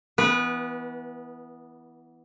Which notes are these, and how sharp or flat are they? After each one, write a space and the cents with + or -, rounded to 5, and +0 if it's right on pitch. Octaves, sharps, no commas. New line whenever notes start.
E3 +0 B3 +0 B4 -30